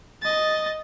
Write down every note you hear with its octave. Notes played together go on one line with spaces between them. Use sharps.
D#5 A6